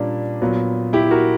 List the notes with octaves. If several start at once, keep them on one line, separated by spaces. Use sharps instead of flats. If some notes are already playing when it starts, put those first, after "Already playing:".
Already playing: A#2 G3 A#3 C#4 D4
A#2 F#3 B3
E4 G4
F#4 A#4